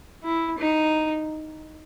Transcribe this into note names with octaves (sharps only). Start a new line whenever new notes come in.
E4
D#4